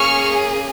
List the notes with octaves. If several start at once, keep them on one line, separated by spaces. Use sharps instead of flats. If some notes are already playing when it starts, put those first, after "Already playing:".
Already playing: A#3 C#4 G#4 C#6 F6